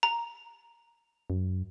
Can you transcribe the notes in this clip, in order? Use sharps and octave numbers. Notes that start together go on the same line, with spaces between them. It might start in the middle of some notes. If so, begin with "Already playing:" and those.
A#5
F#2